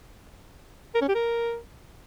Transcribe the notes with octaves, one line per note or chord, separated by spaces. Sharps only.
A#4
C#4
G4
A#4